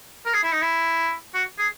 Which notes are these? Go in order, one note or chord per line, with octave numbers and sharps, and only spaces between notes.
A#4
G#4
E4
D#4
E4
F#4
G#4